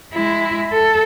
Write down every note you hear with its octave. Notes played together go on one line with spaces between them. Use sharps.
G#3 E4
A4